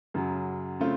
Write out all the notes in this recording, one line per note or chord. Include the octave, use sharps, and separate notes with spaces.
F#2 C#3 F#3
C#3 A3 C4 F4